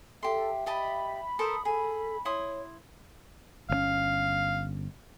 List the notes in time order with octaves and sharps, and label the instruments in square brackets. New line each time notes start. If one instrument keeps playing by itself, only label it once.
[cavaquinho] G4 C6 [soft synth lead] A4 [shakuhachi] E5
[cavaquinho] G4 D#5 A5 [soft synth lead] B5
[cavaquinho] A4 A#4 C5 [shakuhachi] D#6
[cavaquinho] G#4 [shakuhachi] A4
[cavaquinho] E4 C6 D#6 [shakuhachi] C#5
[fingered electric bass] G1 D3 C#4 [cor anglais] F5